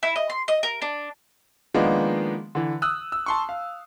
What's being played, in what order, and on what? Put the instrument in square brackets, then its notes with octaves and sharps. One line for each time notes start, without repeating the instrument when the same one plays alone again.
[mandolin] E4
D#5
C6
D#5
A#4
D4
[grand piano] D#3 F3 G#3 A#3 B3 D4
D3 E3
D#6 E6 F#6
E6
A5 C6 C#6
F5